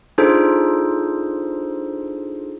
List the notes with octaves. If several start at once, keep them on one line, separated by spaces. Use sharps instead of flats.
D4 D#4 F4 G#4 A4 C5